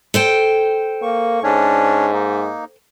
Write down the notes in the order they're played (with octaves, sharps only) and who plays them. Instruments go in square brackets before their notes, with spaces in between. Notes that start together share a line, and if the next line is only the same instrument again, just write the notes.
[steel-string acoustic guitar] A4 C5 G5
[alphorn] A#3 [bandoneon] C#6
[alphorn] G#2 [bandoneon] C#4 D4 C#5
[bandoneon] A#3 D#4